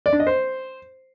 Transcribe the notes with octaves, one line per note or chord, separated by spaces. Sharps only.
D5
D4
D#5
C5